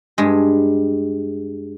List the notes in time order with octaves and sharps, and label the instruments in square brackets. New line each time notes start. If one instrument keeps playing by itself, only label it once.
[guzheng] G2 G#3